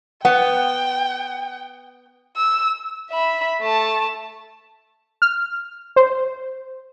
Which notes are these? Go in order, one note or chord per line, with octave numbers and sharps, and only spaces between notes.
B3 F#5 G5
E6
E5 B5
A3 A5
F6
C5